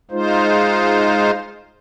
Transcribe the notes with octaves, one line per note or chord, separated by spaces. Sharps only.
G#3 D#4 F4 C5